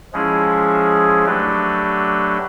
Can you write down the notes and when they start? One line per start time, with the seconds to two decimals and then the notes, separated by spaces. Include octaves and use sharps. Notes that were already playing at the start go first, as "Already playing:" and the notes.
0.13 F3 G#3 C#4 E4 G#4
1.25 F#3 A3 D4 G4 B4